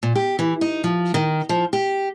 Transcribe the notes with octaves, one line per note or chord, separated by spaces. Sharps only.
A#2
G4
E3
D#4
F3
D#3
F3
G4